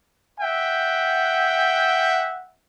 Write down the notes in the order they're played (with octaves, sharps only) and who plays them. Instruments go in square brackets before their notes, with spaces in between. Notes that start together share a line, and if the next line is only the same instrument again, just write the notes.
[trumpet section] E5 F#5 G5